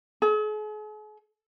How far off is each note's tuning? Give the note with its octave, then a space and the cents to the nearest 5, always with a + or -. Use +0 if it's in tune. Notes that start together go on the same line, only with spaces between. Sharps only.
G#4 +45